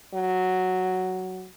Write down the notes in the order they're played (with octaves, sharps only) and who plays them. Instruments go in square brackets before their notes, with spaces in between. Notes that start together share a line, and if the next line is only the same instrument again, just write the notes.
[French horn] F#3